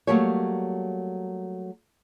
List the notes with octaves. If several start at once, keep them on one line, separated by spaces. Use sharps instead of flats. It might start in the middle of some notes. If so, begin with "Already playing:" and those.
F#3 G3 A3 A#3 G4 C#5